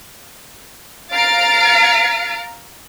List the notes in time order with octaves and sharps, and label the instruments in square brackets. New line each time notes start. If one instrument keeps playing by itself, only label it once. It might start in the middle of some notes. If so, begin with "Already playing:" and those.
[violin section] F5 A#5 F6 A6 C7 D7